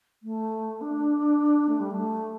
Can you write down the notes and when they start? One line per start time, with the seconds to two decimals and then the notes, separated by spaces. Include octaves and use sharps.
0.23 A3
0.81 D4
1.69 A3
1.80 G3
1.91 A3